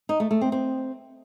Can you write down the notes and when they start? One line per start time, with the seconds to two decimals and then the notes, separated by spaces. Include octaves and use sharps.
0.09 D#4
0.20 A3
0.31 A3
0.41 C4
0.52 C4